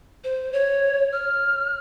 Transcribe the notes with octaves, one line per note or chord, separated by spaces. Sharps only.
C5
C#5
F6